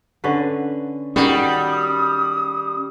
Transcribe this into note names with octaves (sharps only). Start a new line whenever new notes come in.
D3 C#4 B4
D#3 G3 C#4 F#4 G#4 D#6